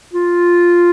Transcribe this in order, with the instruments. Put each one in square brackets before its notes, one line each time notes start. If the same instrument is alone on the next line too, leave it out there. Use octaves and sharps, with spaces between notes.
[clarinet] F4